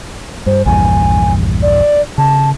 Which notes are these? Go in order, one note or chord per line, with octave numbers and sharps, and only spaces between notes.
G2 C5
A#1 E2 G2 G#5
D5
C#3 A5